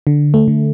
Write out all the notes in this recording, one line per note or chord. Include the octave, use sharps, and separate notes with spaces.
D3
A3
D3